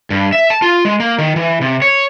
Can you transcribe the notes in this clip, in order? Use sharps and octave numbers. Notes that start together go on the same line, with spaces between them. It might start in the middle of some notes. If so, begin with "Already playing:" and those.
G2
E5
A5
F4
G#3
A#3
D#3
E3
C3
C#5